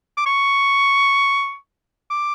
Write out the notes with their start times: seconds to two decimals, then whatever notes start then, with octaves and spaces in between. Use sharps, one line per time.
0.17 D6
0.26 C#6
2.11 D6